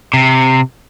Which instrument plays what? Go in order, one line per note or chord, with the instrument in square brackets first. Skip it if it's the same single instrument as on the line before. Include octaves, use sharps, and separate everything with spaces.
[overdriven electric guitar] C3